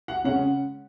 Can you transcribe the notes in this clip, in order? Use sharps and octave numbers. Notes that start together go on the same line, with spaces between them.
F#5
C#3 G#3 C#4 F#5